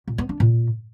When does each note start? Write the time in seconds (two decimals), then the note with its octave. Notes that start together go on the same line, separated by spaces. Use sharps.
0.08 A#2
0.18 B3
0.29 D4
0.40 A#2